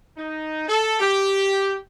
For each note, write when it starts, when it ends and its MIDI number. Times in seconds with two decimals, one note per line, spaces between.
0.17 0.64 63
0.68 0.97 69
1.00 1.76 67